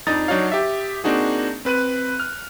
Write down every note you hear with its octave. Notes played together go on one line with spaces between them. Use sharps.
F2 D4 D#4 A#5 D#6 A6
F#3 D4 D#4 F#4 C#5 F5
G4 E5
A#3 C4 D4 D#4 F#4 G#4
C4 B4 F#6 D#7
F6